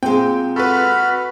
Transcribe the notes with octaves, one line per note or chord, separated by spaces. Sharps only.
A#2 G#3 C4 G5
F#4 A4 B4 B5 F6